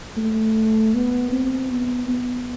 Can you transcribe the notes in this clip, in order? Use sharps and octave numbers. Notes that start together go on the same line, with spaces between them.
A3
B3
C4
B3
B3